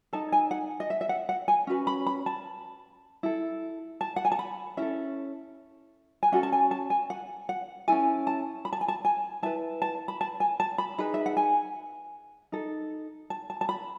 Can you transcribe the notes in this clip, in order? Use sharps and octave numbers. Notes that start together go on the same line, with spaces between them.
D#4 A4 A5
G#5
F#5
D#5
E5
E5
F#5
F#5
G#5
C#4 F#4 B4
B5
B5
A5
E4 A4
A5
F#5
G#5
A5
B5
C#4 E4 A4 E5
G#5
C#4 F#4 A4 F#5
A5
G#5
A5
G#5
F#5
F#5
C#4 E4 A4 G#5
A5
B5
A5
G#5
A5
G#5
E4 B4 A5
A5
B5
A5
G#5
A5
B5
D#4 G#4 B4 B5
E5
F#5
G#5
D#4 A4
A5
A5
A5
B5